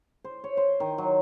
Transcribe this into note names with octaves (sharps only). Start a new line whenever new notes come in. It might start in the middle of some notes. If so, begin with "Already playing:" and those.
C5
C#5
C5
D#3
F#3